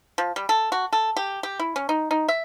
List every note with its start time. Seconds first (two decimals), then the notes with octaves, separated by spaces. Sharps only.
0.18 F3
0.36 G3
0.49 A4
0.72 F#4
0.93 A4
1.17 G4
1.43 G4
1.59 E4
1.76 C#4
1.89 D#4
2.11 D#4
2.28 E5